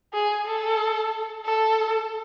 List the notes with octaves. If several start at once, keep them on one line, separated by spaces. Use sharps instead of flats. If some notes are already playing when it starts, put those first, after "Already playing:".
G#4
A4
A4